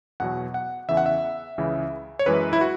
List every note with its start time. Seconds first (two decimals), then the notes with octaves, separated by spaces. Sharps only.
0.20 E2 B2 F#3 F#5
0.54 F#5
0.88 E2 C#3 E3 E5
0.97 F#5
1.06 E5
1.58 C#2 C#3 E3
2.19 C#5
2.26 F#2 E3 G#3 B4
2.53 E4
2.61 F#4